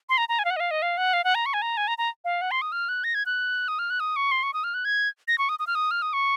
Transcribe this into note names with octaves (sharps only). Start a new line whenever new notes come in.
C6
A#5
A#5
G#5
F5
F#5
D#5
F5
D#5
F5
F#5
F5
F#5
A#5
C#6
G#5
A#5
G#5
A#5
A#5
F5
F#5
C6
D#6
F6
F#6
A#6
G#6
F#6
D#6
F6
F#6
D#6
C#6
C6
C#6
D#6
F6
F#6
G#6
A#6
C#6
D#6
D#6
F6
D#6
F6
D#6
C#6